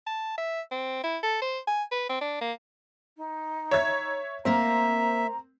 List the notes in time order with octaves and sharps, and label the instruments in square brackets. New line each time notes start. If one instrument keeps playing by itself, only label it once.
[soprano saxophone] A5
E5
C4
E4
A4
C5
G#5
B4
C4
D4
A#3
[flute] D#4
[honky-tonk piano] C#5 E5 G#6
[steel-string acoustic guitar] A#3 A#4 F5 [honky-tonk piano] C4 [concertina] E5 [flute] A#5